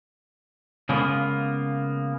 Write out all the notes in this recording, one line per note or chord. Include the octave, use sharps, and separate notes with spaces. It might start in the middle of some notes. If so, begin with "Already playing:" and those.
C#3 G#3 A#3 B3